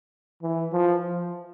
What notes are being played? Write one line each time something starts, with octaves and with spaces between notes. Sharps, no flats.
E3
F3